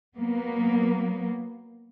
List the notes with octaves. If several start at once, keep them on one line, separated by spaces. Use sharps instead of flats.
F#3 A#3 B3